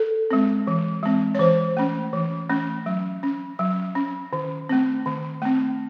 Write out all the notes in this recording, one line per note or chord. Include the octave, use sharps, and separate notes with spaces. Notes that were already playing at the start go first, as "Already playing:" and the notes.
Already playing: A4
G#3 C4
E3
G#3 C4
C#5
E3 C5
A3 C#4
E3
A3 C#4
F#3
C#4
F#3
C#4
D#3
A3 C4
D#3
A3 C4